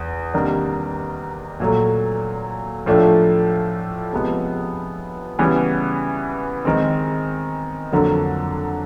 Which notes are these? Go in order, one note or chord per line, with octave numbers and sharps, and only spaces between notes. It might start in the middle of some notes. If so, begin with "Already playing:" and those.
Already playing: E2
C3 D#3 G3 A#3 D4
A#2 F#3 A3
A2 F3 A3 D4
C3 F3 G#3 B3
C#3 E3 G3 B3
D#3 G#3 C4
F2 D3 F#3 A#3